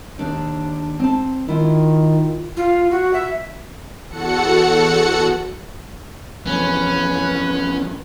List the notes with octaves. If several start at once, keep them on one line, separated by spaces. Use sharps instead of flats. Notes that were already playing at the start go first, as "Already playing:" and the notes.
D#2 D4
C4 A5
D#3 E4 F4
F4
F#4
E5
E2 F#4 A4 F#5 C#7
E1 F2 E3 C#4 B4